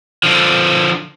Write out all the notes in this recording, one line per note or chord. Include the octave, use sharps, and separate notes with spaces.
D3 F3